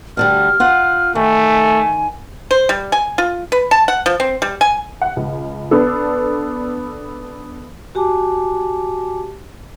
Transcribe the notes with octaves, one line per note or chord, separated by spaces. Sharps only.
D2 D3 G3 F6
F4 F#5
D#3 A3 G#5
C5
G3
G#5
F4
B4
A5
F#5
F3
C4
G3
G#5
F#5
C#2
B3 D4 A4
F#4 G4 G#5 A5 D6